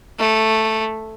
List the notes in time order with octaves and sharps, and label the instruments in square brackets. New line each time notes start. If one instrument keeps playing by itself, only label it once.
[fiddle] A3